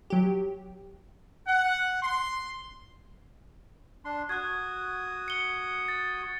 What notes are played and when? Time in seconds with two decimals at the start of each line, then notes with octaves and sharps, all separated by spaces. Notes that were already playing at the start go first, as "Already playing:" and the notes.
0.10 F#3 G4
1.47 F#5
2.01 C6
4.05 D4 C6
4.29 F#4 D#6 F#6 G#6
5.28 C#7 G7
5.88 A6